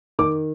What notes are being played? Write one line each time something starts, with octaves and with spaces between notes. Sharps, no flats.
D#3 D6